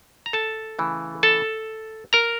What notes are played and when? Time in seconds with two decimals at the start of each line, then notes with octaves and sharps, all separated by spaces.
0.26 A#5
0.33 A4 A5
0.79 C#3 E3 A3
1.23 A4 A5
2.13 A#4 A#5